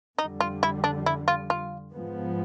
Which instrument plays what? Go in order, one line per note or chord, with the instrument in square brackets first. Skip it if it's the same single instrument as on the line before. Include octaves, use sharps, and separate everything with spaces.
[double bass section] F2 D3 G3 [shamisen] D#4
[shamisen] F4
E4
D4
E4
F4
F4
[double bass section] G#2 F3 G#3 B3